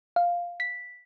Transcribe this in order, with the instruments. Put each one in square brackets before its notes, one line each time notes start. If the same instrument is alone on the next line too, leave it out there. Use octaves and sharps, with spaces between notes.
[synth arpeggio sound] F5
B6